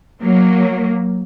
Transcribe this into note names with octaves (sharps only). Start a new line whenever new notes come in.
F#3 A#3